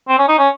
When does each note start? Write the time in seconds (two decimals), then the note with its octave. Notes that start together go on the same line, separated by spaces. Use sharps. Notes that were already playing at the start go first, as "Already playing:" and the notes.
0.09 C4
0.19 C#4
0.28 D#4
0.38 C#4